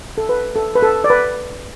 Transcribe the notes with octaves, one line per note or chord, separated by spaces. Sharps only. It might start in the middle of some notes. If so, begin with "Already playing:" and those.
A4
B4
A4
B4
A4
D5
B4